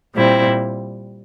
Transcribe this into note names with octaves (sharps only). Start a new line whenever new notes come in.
A#2 G3 C4 E4